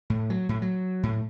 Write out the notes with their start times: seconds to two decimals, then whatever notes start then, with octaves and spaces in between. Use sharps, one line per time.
0.10 A2
0.30 F#3
0.49 A2
0.62 F#3
1.03 A2